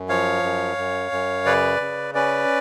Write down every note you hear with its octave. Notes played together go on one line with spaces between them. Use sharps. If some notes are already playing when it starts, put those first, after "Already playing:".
Already playing: F#2
F3 C#5 F5
F#2
F#2
F#2
C#3 B4 D5
C#3
C#4 B4 D5